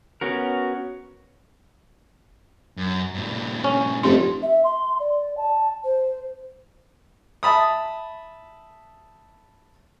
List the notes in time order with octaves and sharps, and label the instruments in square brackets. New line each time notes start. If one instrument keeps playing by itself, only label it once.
[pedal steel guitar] B3 C#4 F#4 A#4
[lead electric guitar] F#2
G2 A#2
[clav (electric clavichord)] C#4
[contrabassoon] F1 [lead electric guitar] D#4 C5 [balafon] G4 C6
[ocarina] E5
C6
D5
A5
C5
[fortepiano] E5 A5 B5 D#6